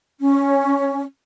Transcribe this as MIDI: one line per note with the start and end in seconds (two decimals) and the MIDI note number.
0.20 1.03 61